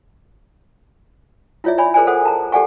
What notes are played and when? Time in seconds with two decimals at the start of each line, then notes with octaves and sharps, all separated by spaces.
1.64 E4 F4 C#5 D5 E5
1.78 C#5 D5 G#5 B5
1.94 G#4 A#4 C5 D5 G#5
2.07 A4 C5 F#5 D#6
2.25 A5 A#5
2.52 G4 A4 D5 F#5 G#5 C#6